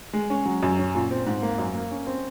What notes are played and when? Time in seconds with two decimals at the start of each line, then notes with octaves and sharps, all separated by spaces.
0.13 G#3
0.30 C#4
0.45 F#3
0.63 F#2
0.79 C#4
0.95 A#2
1.11 C4
1.26 G#2
1.42 A#3
1.58 F#2
1.74 A#3
1.91 C#4
2.07 C4